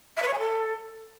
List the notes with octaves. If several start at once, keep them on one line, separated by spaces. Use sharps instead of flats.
E5
B4
C#5
G#5
A4